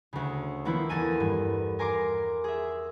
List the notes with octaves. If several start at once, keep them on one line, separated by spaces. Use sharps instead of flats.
D2 C#3
D#3 F3 A#3 B3 E4
E2 A4 A#4 G#5 D#7
G2
A#4 G#5 A#5 C6 D6
G#4 E5